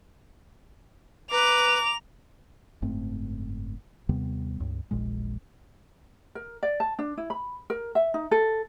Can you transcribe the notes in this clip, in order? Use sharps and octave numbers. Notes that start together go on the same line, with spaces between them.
B4 A#5 D6 F7
F#1 G#2 A3 C4
D#2 C3 G3 B3
C#2 G2
E1 A#1 A#2 G#3
A#4
D5
A5
D4
E4
B5
A#4
E5
D#4
A4